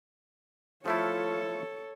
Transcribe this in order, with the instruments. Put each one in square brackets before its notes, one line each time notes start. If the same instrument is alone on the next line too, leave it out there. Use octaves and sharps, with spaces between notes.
[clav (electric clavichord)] F3 A3 E4 [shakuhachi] F4 [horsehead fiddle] A4 C#5